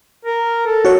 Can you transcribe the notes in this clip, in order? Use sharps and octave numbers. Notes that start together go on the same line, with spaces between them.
A#4
A4
F#4 C#5